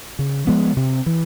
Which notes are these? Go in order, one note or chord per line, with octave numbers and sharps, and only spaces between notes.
C#3
F3 G#3 B3
C3
E3